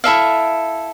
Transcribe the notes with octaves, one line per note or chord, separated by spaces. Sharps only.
E4 A4 E5 F5